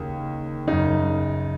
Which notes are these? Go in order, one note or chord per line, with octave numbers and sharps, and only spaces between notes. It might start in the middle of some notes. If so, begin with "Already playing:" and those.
Already playing: D#2 C#3
F#2 C#3 D#4